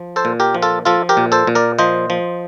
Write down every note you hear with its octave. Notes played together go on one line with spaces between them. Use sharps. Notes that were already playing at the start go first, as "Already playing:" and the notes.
Already playing: F3
A4 C5
A#2
G4 A#4
F3
F4 A4
F3 F4 A4
G4 A#4
A#2
A4 C5
A#2
A#4 D5
F3 C5 D#5
F3